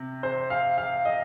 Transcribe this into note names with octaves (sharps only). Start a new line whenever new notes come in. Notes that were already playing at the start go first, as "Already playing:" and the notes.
Already playing: C3
C5
F5
F5
D#5